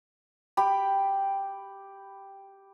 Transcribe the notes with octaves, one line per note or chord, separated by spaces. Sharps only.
G4 G5 B5